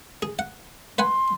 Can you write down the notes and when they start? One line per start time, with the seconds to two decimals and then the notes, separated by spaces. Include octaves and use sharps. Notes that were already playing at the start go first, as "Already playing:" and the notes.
0.22 G#4
0.39 F#5
0.98 B4 F#5 G#5 C6